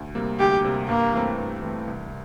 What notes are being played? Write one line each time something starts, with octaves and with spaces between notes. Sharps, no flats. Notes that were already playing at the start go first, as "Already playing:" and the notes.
Already playing: D2
C3 G3 A#3
D2 G4
C3 G3 A#3
G2 A#3
E3 A3 C4
G2
E3 A3 C4
C2